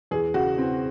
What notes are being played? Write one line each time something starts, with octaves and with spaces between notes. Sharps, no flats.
E2 G#4
C#3 F#4
E3 C4